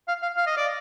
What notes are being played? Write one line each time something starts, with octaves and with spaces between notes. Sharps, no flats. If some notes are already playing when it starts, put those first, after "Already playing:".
F5
F5
F5
D#5
D5